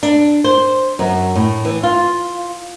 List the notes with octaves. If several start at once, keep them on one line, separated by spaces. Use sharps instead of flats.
D4
C5
F#2
A2
E3
F4